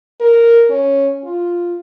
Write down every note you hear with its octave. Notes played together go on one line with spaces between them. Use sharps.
A#4
C#4
F4